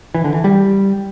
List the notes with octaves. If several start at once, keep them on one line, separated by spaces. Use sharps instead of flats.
E3
D3
E3
G3